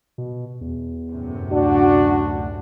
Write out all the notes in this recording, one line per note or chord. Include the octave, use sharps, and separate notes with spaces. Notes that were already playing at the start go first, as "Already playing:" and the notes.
B2
E2
F#2 A2 C3
D2 D4 F#4